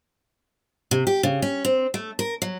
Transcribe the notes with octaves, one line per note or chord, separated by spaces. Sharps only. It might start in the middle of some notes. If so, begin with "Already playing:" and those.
C3
G4
C#3
C#4
C4
A3
A#4
F#3